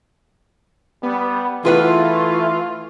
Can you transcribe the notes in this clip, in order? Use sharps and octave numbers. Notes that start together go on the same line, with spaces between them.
G3 B3
E3 A3 F4 G#4 B4 F#5